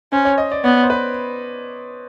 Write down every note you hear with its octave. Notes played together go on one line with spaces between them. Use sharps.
C#4 C5
C#5
D#5
D5
B3 C#5
C5
B4